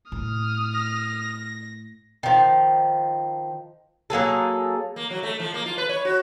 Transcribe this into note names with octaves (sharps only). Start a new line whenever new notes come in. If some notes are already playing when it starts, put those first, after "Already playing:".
A2 D#6 F6
A#6
D#3 F3
F#3 A#3 G#4 A4
A#3
F#3
A3
F3
A#3
F4
B4
C#5
F#4